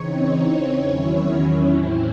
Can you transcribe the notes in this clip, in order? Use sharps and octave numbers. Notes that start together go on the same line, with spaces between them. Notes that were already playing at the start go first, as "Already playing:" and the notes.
Already playing: C#3 E3 C4 D#4 C#5
E2 D#3 F#3 C#4 E4
A2 E3 C4 E4 C5